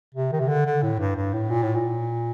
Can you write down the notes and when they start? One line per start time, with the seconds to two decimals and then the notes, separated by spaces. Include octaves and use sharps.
0.14 C3
0.32 D#3
0.40 C3
0.48 D3
0.66 D3
0.83 A2
0.99 G2
1.16 G2
1.33 A2
1.49 A#2
1.62 A2
1.75 A#2